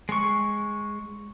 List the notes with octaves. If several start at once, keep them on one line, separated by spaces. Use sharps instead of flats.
G#3 C#6